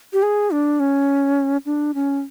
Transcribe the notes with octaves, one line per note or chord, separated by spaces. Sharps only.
G4
G#4
D4
C#4
D4
C#4